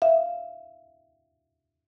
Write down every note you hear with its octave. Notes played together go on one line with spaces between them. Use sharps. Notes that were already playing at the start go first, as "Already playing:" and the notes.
E5 F5